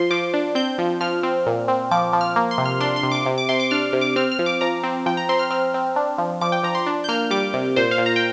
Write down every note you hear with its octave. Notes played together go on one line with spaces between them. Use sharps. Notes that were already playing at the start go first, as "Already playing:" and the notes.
Already playing: F3 C6
F3 D6
D4
C4 G6
F3
F3 F6
C4
A#2
C4
F3 D6
F3
F6
A#3
C6
C3
F6
D4 C6
C6
C3
D6
C3
D6
C3 C6
D6
D4 F6
C3
D6
C4 F6
F6
F3
D6
F3 A#5
C4
F3 G5
A#5
C4 C6
F6
C4 F6
C4
D4
F3
F3 D6
G5
F3 A#5
C6
D4
G6
A#3 F6
G3 D6
C3
A#2 C5
F5
A#2
A#5
G5